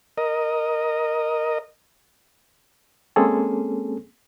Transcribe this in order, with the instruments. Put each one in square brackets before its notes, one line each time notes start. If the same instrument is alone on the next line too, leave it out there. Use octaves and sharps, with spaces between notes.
[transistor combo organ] A#4 D#5
[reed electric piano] G#3 A#3 C4 C#4 G#4 A4